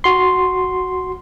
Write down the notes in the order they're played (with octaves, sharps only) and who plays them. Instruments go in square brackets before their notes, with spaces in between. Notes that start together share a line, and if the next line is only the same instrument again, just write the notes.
[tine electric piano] F#4 C6